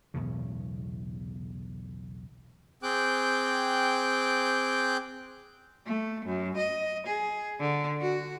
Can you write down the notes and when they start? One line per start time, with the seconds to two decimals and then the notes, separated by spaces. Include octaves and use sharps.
0.14 B1 E2 A2 C#3
2.83 C4 G#4 G5 D6 F#6 G6
5.86 A3
6.25 F#2
6.57 D#5
7.07 G#4
7.60 D3
8.01 F#4